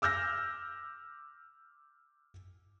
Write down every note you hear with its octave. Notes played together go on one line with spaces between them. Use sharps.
D6 E6 F6 G6 A#6